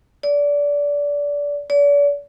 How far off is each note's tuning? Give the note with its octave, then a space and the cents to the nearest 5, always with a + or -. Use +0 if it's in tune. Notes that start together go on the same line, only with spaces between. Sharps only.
D5 -25
D5 -40